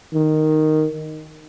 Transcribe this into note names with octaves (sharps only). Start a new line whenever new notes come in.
D#3